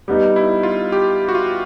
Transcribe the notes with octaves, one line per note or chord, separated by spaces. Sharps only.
G3 B3 D#4
E4
F4
G4
F#4
F4